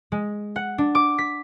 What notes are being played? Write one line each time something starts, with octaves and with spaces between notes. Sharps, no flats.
G#3
F#5
D4
D6
B6